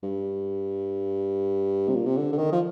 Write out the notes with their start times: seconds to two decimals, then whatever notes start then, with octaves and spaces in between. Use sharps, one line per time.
0.03 G2
1.88 C3
1.95 A#2
2.06 C3
2.17 D3
2.32 D3
2.38 D#3
2.52 F3